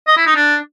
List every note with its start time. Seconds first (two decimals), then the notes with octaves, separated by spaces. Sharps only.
0.07 D#5
0.17 E4
0.26 D#4
0.36 D4